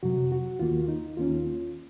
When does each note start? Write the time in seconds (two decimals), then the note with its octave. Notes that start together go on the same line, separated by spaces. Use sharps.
0.03 F2 C3 F#3 F#4
0.32 F#4
0.60 D#2 D#3 A#3 F4
0.88 D#4
1.17 D#2 D#3 A#3 C#4 F4